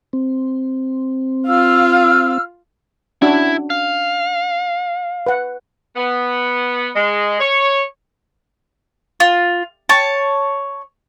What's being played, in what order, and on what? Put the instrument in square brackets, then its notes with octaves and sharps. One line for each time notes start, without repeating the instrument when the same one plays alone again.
[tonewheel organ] C4
[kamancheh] F4 F5 [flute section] E6 F6
[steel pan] C#4 D4 F#4 [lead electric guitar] E4
[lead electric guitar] F5
[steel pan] B4 F#5
[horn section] B3
G#3
C#5
[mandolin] F4
C#5 A5